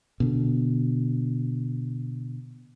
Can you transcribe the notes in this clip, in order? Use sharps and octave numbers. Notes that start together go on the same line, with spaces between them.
B2 D3